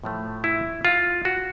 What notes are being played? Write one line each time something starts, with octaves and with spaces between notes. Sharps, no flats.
A2 F3 A3
E4
F4
F#4